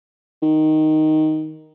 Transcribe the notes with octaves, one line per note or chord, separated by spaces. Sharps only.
D#3